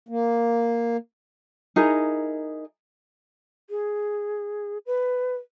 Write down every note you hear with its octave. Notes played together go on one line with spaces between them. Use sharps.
A#3
D#4 E4 G#4 A#4
G#4
B4